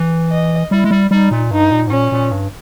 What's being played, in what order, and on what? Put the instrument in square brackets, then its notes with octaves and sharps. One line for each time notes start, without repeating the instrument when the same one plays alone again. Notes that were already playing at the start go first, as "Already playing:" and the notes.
Already playing: [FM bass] E3
[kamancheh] D#5
[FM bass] G3 [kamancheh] E4
[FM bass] G#3
G3
[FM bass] G3 [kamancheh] D#4
[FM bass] A#2
[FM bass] G2 [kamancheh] D#4
[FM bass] A#2
G#2
[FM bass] A#2 [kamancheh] C#4
[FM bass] A#2
G2